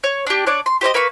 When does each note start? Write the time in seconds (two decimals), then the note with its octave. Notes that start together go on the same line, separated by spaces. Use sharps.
0.04 C#5
0.27 D4 G4
0.47 D4 C#5 D5
0.66 C6
0.81 G4 C5 C#5 D#5
0.94 A#3 B4 F5 C#6